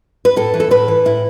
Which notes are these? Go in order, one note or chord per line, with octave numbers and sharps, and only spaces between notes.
B4
A2 A4
E3
A4
A2 B4
E3
A2 E4